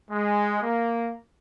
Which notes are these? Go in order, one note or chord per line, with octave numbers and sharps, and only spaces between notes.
G#3
A#3